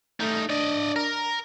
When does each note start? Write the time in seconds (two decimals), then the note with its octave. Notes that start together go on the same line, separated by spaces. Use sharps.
0.20 G3 A3 D#4
0.50 D4 D5 D#5
0.96 A#4